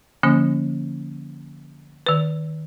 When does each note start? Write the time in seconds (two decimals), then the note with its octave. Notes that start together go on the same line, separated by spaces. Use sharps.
0.23 D3 F3 A#3 C#4
2.07 D#3 B4